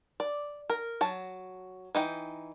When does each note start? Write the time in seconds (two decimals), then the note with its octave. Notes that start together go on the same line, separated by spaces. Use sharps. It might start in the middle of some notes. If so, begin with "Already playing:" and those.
0.20 D5
0.70 A#4
1.01 F#3 A5
1.95 E3 D#4 G5